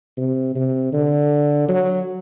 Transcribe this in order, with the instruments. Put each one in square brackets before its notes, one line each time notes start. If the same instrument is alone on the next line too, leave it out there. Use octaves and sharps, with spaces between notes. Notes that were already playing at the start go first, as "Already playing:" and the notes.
[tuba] C3
C3
D3
F#3